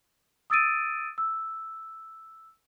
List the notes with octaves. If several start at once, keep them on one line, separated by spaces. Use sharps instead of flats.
D#6 E6 A6 D7 D#7
E6